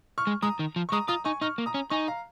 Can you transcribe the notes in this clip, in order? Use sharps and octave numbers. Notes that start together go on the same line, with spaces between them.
C#6 F6
G#3
G#3 A#5 D#6
D#3
F3
C#6
G#3 A#5 D#6
F4 A#5 D#6
D#4 G#5 C#6
D#4 C#6 F6
A#3
A#5 D#6
C#4
D#4 G#5 C#6
F5 A#5